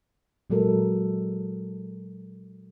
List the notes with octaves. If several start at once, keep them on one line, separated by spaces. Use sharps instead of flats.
A#2 F#3 G#3 A4 A#4